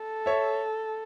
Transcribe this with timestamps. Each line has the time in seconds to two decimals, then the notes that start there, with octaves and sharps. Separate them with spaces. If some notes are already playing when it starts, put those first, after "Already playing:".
Already playing: A4
0.26 C#5 E5